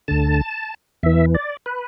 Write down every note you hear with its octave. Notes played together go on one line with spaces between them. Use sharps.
D2 D3 A5
E2 E3 E5
D5
B4